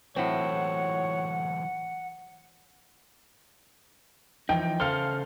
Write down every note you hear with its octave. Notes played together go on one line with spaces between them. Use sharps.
A2 E3 F#3 C4 C#5 F#5
E3 F3 D#4 G5
C#3 A4 C5 F5 F6